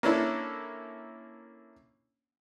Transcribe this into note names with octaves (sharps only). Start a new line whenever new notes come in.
A#3 C#4 D4 E4 A4